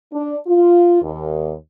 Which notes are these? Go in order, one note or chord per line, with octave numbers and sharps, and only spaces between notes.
D4
F4
D#2